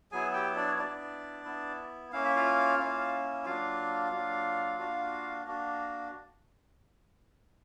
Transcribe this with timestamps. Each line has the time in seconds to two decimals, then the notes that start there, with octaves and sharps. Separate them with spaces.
0.12 F#3 B3 E4 G#4 G#5
0.34 G4 G5
0.56 D4 D5
0.67 C#5
0.79 B3 D4 E4 D5
1.45 B3 E4
2.12 A#3 C#4 E4 F5
2.24 E5
2.36 F4 F5
2.78 A#3 C#4 E4
3.45 F#3 A#3 D4 F4 F5
4.12 F#3 A#3 D4
4.79 A#3 D4 F#4
5.46 A#3 D4 F#4